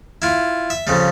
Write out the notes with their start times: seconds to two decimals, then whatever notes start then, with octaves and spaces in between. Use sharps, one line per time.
0.22 E4 F4
0.70 E5
0.87 F2 C#3 G3